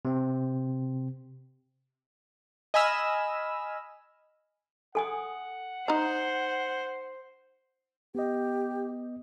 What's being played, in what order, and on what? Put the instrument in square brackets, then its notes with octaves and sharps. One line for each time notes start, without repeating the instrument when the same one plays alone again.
[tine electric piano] C3 C4
[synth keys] D#5 G#5 B5 E6 F6
[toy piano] A4 G#5 D#6 [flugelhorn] F#5
[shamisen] D#4 A#5 [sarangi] C5
[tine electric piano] B3 D#5 [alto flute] G4